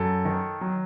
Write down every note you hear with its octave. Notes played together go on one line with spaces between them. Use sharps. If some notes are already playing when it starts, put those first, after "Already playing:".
Already playing: F#2 A4
D#3
F#3